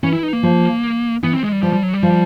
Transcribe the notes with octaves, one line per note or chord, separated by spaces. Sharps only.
E3 C#4
E4
D#4
A#3
F3
E3 B3
C4
G#3
G3
F3 G3
G3
F#3
G3
F3